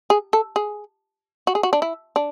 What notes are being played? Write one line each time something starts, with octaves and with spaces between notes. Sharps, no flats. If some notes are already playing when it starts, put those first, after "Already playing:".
G#4
A4
G#4
F#4
G#4
F#4
D4
E4
D4